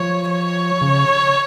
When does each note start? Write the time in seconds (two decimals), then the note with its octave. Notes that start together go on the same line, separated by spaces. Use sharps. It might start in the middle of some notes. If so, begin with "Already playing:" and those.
Already playing: F3 C#5
0.31 C#5
0.82 C#3